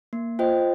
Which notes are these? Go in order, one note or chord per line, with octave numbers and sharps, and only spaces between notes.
A#3
F4 C5 D#5 G5